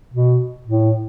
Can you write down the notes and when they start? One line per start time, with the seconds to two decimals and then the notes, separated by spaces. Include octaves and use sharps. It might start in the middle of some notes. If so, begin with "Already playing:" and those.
0.14 B2
0.67 A2